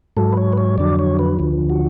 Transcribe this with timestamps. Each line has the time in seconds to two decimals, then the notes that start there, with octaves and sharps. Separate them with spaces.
0.17 G#2 F#3 A4
0.32 B4
0.37 C#5
0.53 B4
0.57 C#5
0.78 F2 D3 F#3 D5
0.99 C#5
1.19 B4
1.39 D2 D3 F3
1.70 F#4